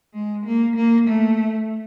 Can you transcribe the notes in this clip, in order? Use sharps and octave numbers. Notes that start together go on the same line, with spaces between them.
G#3
A#3
A#3
A3